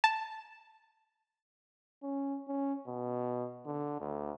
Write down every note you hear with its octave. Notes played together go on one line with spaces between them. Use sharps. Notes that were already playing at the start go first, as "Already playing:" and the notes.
A5
C#4
C#4
B2
D3
D2